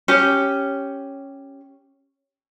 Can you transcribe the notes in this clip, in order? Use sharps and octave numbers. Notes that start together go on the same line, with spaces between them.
C#4 G4